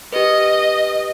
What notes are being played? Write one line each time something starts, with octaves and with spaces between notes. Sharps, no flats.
G4 B4 D#5